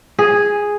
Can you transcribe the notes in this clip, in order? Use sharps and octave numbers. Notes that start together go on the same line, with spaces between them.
G#4